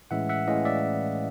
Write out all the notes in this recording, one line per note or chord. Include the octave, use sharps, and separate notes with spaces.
A2 E3 G#3 C#4 E5 F#5
E5 F#5
A2 E3 G#3 C#4 D#5 F5
D5 E5